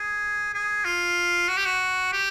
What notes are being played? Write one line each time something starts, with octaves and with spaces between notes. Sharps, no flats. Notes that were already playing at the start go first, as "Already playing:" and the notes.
Already playing: G#4
G#4
F4
F#4
G4
F#4
G4